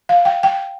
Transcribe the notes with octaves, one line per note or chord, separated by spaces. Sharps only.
F5
G5
G5